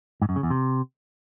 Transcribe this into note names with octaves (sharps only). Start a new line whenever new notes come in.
G#2
F#2
C#3
E2
C3